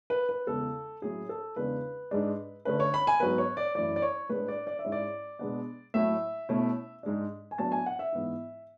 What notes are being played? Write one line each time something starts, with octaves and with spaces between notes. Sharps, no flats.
B4
B4
E2 C#3 G#3 A4
A2 F#3 C#4 E4 G#4
A4
E2 C#3 G#3 D4 B4
G#2 G#3 D4
D3 A3 C#4 B4
C#5
B5
G#5
G#2 F#3 B3 B4
C#5
D5
F#2 E3 A3 E4 D5
D5
C#5
A2 G#3 D4 B4
D5
D5
E5
G#2 G#3 C#4 E4
D5
B2 G#3 B3 D4
A2 F#3 A3 E4 E5
B2 A3 C#4 E4
G#2 G#3 D4
G#5
A2 F#3 B3 D4 A5
G#5
F#5
E5
G#2 E3 B3 E4